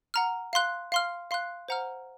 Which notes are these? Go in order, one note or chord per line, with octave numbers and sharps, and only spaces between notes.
F#5 A#5 F6
F5 C6 F#6
F5 C6 F6
F5 C6 F#6
C5 F#5 A#5 F6